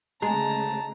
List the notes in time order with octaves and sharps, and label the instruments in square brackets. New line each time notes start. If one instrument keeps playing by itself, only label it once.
[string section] D2 C#3 [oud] G#3 [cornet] A5 [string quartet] A#5